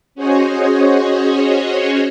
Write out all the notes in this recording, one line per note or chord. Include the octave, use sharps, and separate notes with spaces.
C#4 F#4 G#4 C5 C#5 D#5